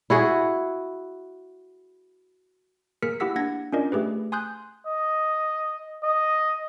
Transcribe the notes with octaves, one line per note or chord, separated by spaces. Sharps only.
E4 F#4 G#4
A#3 G#4 A#4 F6 B6 C#7
A#3 E4 G4 F#5 E6 B6
A#3 D4 F#5 G#6 A#6
C#4 D4 F4 A#4 D5 D#5
A3 G4 G#4 B4
G#5 C6 D#6 F#6 G6
D#5
D#5